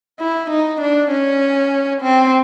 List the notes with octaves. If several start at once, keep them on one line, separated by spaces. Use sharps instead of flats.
E4
D#4
D4
C#4
C4